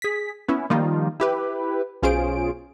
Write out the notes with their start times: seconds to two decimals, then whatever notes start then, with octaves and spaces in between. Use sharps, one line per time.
0.02 G#4 B6
0.48 B3 C#4 E4
0.70 D#3 F3 G3 A#3 D#4 F4
1.20 E4 G4 B4
2.03 B1 C#4 F4 G#4 C5 D7